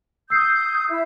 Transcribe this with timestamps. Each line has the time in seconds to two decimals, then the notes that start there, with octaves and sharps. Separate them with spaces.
0.30 D#6 E6 G6 C7
0.90 E4 E5